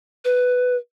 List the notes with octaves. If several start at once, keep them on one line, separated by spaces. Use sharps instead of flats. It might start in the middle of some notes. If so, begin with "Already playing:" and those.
B4